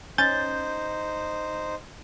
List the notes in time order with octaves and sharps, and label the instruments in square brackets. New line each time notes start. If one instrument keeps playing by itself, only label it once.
[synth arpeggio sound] C#4 A6 [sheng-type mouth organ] D#4 C5 [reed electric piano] G6